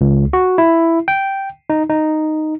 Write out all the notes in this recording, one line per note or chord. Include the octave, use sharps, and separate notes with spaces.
C#2
F#4
E4
G5
D#4
D#4